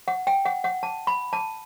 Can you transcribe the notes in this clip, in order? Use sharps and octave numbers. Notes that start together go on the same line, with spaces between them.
F#5
G5
F#5
F#5
A5
B5
A5